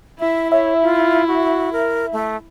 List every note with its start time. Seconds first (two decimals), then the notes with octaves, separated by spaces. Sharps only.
0.19 E4 E5
0.52 C#5 E5
0.83 F4
1.28 F#4
1.73 A#4
2.12 A3